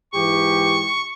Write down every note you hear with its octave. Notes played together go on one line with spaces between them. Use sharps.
G#2 E3 G4 C#6